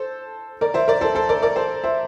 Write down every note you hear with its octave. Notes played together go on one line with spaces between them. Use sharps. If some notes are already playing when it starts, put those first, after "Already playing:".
Already playing: A4 C5
A#4 D5
C5 E5
A#4 D5
A4 C5
A4 C5
A#4 D5
A#4 D5
A4 C5
C5 E5